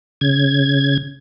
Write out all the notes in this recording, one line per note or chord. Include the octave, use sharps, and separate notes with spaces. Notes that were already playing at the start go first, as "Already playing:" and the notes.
C#3 G#6